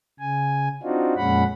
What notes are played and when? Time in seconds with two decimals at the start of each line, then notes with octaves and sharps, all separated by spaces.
0.20 C#3 G#5
0.83 C4 D4 D#4 F4 F#4
1.17 F2 A#2 G#3 C#4 F#5 B5